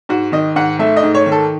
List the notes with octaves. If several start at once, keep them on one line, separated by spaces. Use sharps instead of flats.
G#2 F#4
D#3 D#5
G#2 F#5
A3 E5
D#5
G#2
C#5
D#3
A4